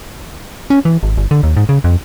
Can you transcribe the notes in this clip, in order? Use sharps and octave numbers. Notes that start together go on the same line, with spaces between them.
C#4
E3
G#1
G1
D3
D#2
G#2
C#3
F2